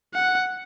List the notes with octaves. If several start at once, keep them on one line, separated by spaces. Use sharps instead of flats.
F#5